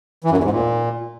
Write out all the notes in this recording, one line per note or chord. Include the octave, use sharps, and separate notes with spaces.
E3
F#2
E2
G#2
A#2